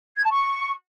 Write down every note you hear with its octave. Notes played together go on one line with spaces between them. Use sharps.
G#6
A5
C#6